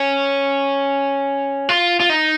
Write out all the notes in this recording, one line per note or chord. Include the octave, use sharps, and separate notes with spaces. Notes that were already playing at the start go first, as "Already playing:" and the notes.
Already playing: C#4
F4
F4
D#4